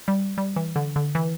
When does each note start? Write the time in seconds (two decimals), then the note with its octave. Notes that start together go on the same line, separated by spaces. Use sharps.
0.08 G3
0.38 G3
0.56 E3
0.76 D3
0.96 D3
1.15 E3